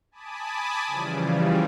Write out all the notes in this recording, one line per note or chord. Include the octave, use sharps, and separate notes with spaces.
G#5 A5 B5 D6 D#6
C#3 E3 F3 G3